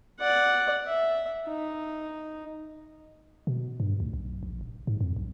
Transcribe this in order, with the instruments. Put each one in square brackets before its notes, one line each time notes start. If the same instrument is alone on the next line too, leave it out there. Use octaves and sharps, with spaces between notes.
[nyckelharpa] D5 F#5
E5
D#4
[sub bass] B2
G2
D2
B1
A#1
D#1
G#2
F2
B1